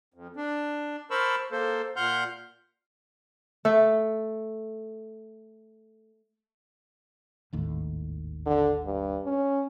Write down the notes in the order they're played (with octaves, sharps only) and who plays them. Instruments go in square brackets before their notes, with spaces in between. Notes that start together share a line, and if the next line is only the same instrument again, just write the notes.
[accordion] F2
D4
A#4 C5 A5 B5 C#6 E6
A#3 A4 C5
A#2 F#5 C6 F6 G6
[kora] A3 A4
[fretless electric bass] G#1 D#2 A2
[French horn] D3
G2
C#4